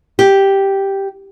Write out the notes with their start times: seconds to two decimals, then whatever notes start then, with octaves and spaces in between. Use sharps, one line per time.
0.19 G4